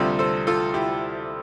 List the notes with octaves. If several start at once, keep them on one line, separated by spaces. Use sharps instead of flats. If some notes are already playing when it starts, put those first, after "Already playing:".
Already playing: D2 C3 G3 C4 F4 A4
A4 C5
F4 A4
E4 G4